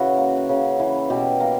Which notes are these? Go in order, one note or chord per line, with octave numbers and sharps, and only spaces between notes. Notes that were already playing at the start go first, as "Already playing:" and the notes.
Already playing: C#3 E3 E4 F#4
A#3
C#3
E3
B2 G4
A#3